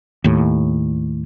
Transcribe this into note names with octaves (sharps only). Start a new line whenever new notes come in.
D#2 A2